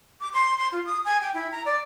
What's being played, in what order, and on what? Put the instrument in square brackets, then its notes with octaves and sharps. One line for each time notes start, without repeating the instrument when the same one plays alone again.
[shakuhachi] D6
C6
C6
F4
D#6
G#5
G5
E4
A#5
D5